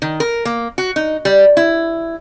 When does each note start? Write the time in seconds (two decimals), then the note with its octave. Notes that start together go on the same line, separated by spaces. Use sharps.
0.02 D#3
0.20 A#4
0.45 A#3
0.78 F#4
0.96 D#4
1.25 G3
1.57 E4